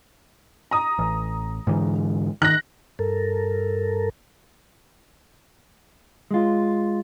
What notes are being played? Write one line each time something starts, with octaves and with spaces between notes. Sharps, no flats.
A#5 D#6
A1
G#2 D3 E3
D#3 F#6 A#6
G2 A4 A#4
G#3 F4